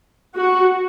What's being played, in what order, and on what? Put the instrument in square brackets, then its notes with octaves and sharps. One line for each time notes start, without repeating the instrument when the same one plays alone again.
[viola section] F#4